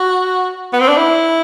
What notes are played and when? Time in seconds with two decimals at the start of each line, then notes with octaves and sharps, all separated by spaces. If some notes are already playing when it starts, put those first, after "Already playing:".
Already playing: F#4
0.73 B3
0.80 C4
0.89 D4
0.97 E4